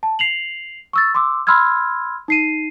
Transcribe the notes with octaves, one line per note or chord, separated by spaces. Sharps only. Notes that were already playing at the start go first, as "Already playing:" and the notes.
A5
C7 F7 F#7
C#6 E6 A6
C6 D6 E6
B5 C6 E6 F6 G#6
D#4 C7 D#7